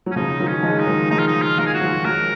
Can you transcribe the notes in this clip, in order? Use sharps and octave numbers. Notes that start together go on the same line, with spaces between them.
F#3
C#4
C#3 F3 D#4
D#3 F#3
C#4
F3 G#3
D#4
D#3 F#3
F3 G#3 D#4
F4
D#4
F4
F3 G#3 A#4
G#4
F#4
D#3 F#3
F3 G#3 A#4